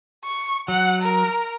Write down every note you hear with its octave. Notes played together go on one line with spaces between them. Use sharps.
C#6
F#3 F#5
A#4